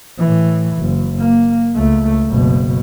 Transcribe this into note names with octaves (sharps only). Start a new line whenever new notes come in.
A2 E3
F#1
A#3
C#2 A3
F#1 B2